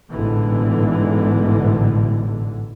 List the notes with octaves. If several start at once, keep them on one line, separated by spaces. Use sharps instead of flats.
A1 G#2 B2 D3 E3